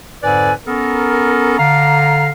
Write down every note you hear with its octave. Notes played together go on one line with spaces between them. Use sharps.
F2 G#2 D3 B4 D5 G#5
B3 C#4 A4 A#4
D3 F5 A#5